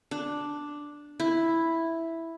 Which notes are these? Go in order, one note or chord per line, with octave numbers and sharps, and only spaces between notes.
D4
E4